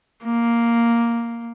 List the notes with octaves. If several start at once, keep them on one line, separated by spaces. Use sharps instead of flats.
A#3